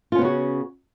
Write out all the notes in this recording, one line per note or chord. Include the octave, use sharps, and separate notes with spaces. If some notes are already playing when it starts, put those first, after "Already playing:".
C#3 B3 C#4 F4 F#4